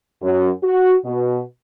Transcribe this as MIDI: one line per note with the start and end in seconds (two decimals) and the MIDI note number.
0.23 0.48 42
0.63 0.95 66
1.04 1.41 47